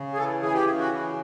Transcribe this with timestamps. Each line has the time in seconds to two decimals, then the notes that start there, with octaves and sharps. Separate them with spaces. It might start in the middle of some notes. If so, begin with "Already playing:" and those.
Already playing: C#3
0.13 G#4
0.17 E3 A4
0.42 E3 G#4
0.54 G4
0.66 C#3 G#4
0.79 F#4
0.91 E3